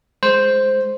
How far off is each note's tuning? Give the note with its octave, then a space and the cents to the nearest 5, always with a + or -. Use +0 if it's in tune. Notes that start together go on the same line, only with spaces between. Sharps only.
G#3 +0 C5 +0